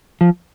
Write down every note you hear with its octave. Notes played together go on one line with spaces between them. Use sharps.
F3